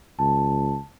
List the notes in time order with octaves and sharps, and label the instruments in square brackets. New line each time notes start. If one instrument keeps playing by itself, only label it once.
[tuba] C#2 [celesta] A5